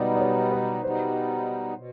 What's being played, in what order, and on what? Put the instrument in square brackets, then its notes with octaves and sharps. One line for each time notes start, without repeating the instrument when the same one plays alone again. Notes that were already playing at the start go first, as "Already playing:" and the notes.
Already playing: [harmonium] B2 G3 B3 D#4 [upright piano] D5 D#5
[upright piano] D5
C#5
B4
[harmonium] B2 G3 B3 D#4 [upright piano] C5
[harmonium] B2